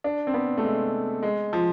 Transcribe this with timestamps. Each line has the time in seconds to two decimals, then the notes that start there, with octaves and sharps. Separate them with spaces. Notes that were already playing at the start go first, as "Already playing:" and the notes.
0.04 D4
0.27 C4
0.34 B3
0.58 A3
0.65 G#3
1.23 G#3
1.53 F3